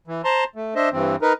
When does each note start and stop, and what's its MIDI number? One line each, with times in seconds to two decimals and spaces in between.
0.07 0.22 52
0.25 0.44 72
0.25 0.44 81
0.25 0.44 82
0.25 0.44 84
0.56 0.74 57
0.75 0.89 62
0.75 0.89 72
0.75 0.89 75
0.75 0.89 76
0.92 1.16 43
0.92 1.16 52
0.92 1.16 60
1.22 1.33 63
1.22 1.33 70
1.22 1.33 71